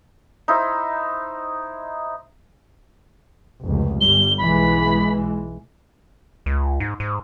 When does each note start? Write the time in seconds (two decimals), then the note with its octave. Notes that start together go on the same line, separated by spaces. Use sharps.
0.48 D#4 E4 C5
3.65 F1 C#2
4.01 G1 G3 G7
4.38 B1 E3 G#3 B5
6.46 C#2
6.80 G#2
7.00 G#2